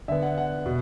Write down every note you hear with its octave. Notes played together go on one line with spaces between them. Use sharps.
D3 B3 E5
F#5
F#5
B2